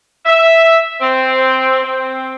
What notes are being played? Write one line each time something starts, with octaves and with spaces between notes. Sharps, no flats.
E5
C4
C4